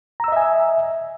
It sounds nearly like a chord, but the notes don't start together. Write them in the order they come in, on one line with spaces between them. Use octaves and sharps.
A#5 E6 D#5 E5 G#5